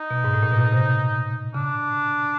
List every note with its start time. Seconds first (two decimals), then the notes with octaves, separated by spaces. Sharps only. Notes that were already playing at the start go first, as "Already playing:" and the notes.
Already playing: D#4
0.10 B2
0.24 G#2
0.34 A2
0.43 A#2
0.52 B2
0.72 C3
1.54 C#3 D4